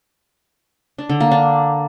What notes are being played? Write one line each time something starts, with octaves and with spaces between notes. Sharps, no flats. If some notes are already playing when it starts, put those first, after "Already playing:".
D4
D3
A#3
D4